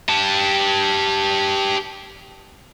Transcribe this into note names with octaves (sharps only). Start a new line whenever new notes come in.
G4 A5